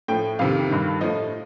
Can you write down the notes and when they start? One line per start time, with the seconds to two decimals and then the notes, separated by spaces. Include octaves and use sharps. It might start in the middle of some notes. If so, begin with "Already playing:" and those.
0.08 A2 F3 G5
0.39 F2 C3 D#3 F5
0.70 G2 D#3
1.01 A2 F3 D#5